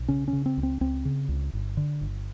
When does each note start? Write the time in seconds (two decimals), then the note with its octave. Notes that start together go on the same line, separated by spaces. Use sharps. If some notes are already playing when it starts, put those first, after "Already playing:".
Already playing: B1
0.08 C#3 C#4
0.28 C#4
0.33 C#3
0.46 C4
0.57 C#2
0.63 C4
0.81 C#2 C4
1.05 C#3
1.29 C#2
1.53 G1
1.77 D3
2.01 G1